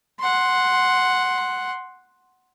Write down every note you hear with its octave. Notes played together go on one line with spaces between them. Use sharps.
F#5 C6